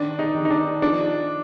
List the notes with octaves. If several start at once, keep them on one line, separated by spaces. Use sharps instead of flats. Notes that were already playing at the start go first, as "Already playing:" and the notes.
Already playing: D3 D#3 D4
D#4
D#3
D#4
D4
F3 D4